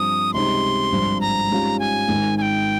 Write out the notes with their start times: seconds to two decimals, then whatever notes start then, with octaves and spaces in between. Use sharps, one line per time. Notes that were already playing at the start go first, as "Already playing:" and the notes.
Already playing: G2 F3 C4 D#6
0.33 C#2 C3 G3 C4 D#4 C6
0.92 G#1 G2 F3
1.21 A#5
1.50 G#2 G3 C#4 F4
1.79 G#5
2.08 G#1 G#2 D#3
2.38 G#5
2.42 G5